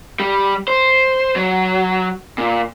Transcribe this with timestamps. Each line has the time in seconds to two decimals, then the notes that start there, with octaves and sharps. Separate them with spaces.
0.20 G3
0.68 C5
1.36 F#3
2.38 A#2